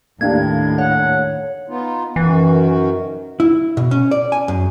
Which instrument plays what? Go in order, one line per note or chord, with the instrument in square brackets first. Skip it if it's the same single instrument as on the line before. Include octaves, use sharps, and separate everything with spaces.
[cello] D#2 A2 [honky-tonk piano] A#3 D4 G4 [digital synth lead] G#6
[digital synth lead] C#5 [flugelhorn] F#5
[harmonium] B3 D#4 F4
[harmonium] F#2 D#3 F#4 [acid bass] E3
[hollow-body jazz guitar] E4
B2
C#4
D5
G#5
F#2